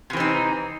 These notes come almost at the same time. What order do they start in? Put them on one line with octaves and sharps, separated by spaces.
C3 E3 C4 D#4